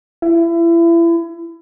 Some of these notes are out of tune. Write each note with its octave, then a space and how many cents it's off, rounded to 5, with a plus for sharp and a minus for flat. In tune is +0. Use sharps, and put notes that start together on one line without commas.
E4 +30